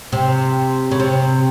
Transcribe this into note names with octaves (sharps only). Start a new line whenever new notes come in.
C3
C#3
C3